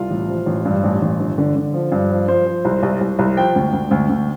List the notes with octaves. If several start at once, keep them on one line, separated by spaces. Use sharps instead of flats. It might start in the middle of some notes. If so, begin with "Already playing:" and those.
Already playing: C2 F4
A1
F3
A1
G2
A1
A1
G1
D3
D3
F3
G2
F3
F3 C5
F3
C2
C2
C2
C2
F3 G5
D2
D2
D2
D2